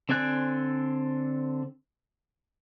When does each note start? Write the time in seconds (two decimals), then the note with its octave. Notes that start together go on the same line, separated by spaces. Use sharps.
0.09 D3 C4 D5 G#5 F#6